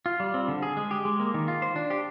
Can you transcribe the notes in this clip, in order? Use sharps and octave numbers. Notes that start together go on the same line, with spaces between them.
F4
G3
C4
D3
G#4
G#3
G4
G#3
A#3
D#3
F4
C5
D4
G4